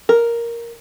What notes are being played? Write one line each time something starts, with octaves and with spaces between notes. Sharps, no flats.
A#4